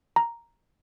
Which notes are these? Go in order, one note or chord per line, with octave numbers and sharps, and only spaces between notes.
A#5